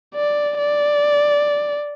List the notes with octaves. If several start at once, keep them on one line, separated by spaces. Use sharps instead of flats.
D5
D5